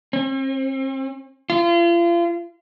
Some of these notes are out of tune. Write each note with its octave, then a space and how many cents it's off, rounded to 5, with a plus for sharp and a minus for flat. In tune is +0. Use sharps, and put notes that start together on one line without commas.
C4 +40
F4 -35